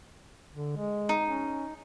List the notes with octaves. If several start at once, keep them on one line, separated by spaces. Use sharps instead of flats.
D3
G#3
D#4
C#4